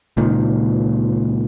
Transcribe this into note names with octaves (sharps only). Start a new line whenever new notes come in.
C#2 A#2 D#3